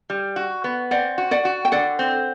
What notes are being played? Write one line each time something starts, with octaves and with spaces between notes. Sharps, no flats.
G3
F#4
B3
C4 D5 F#5
F#4
D5 F#5
F#4
G5
D3 D5 F#5
C4